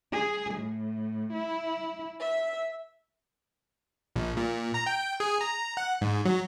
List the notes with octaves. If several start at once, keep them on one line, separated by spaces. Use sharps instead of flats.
G#4
A2
E4
E5
A#1
A#2
A#5
G5
G#4
A#5
F#5
G#2
F#3